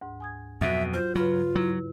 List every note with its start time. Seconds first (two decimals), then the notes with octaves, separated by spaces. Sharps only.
0.01 D2 G#2
0.20 G#5 D#6 G#6
0.61 F2 B2 F#3 F#4 E5 F#6
0.94 F4 C5
1.15 G2 C#3 F#3 F4 B4
1.55 F#3 E4